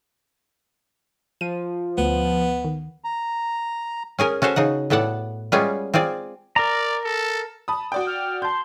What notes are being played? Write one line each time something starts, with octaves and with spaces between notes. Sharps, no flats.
F3 D#7
D2 B3
D#3
A#5
C#4 G#4 A#4 G#5
C#4 F#4 A4 C5 C#5
C#3 D#4 F#5
A2 B3 A4 D5 F#5
G3 G#3 B3 C#4 F4 G#4
C4 F4 G#4 D5
A#4 D5 A#5
A4
A5 B5 D#6
F#4 D5 G5
F6
A5 C6 G6